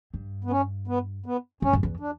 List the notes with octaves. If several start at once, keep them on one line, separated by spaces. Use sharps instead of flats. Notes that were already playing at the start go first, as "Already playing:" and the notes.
G2
B3
C#4
B3
B3
G2 C#4
F#2
E2
D4